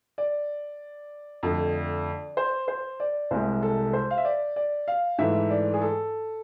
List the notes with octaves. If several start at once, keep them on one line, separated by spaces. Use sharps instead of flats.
D5
F2 D3 A3
C5
C5
D5
C2 C3 G#3 C5
A4
C5
F5
E5
D5
D5
F5
G#2 E3 A3 E5
D5
G#4
A4